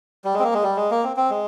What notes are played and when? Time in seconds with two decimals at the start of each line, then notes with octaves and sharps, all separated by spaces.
0.25 G3
0.34 G#3
0.39 C4
0.44 A#3
0.54 G#3
0.63 G3
0.77 G#3
0.91 A#3
1.04 C4
1.17 C4
1.30 G#3